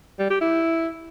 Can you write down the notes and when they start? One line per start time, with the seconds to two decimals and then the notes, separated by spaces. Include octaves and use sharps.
0.19 G3
0.30 G4
0.41 E4